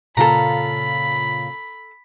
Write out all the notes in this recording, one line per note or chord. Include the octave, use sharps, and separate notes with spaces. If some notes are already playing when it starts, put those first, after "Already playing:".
A#2 C#3 F4 A4 A#5 B5